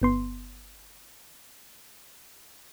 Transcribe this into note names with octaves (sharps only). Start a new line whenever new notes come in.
G1 B3 C6